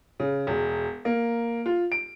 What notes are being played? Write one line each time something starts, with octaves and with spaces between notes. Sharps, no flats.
C#3
E1
A#3
F4
D7